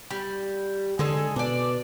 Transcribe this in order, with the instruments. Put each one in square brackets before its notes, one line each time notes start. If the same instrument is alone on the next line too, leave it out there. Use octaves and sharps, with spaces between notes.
[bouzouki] G3
[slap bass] D3 [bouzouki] G#3 G#4 A4
[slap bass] B2 [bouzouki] D4 D5